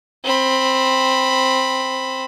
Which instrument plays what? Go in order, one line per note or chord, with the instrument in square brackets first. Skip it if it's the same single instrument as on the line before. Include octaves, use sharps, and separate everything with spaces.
[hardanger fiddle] C4 B5